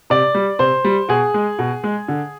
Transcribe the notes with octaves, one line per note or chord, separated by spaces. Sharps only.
C3 D5
G3
C3 C5
G3
B2 G#4
G#3
B2
G#3
D3